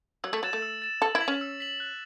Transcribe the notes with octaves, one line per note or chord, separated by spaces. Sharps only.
F#3 E6
A3
F#3 A6 E7
A3
E6
A6 E7
A4 E6
E4
B6 F#7
C#4
E6
B6 F#7
F#6